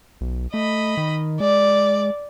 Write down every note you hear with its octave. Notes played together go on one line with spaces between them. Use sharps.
B1
A3 D#5 B5
D#3
G#3 D5